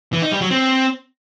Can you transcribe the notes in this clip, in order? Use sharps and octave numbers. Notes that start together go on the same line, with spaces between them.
E3
D#4
G3
F#3
C4